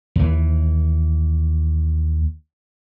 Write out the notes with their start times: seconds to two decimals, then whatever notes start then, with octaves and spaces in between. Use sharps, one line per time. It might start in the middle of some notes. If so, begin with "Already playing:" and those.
0.16 D#2 E3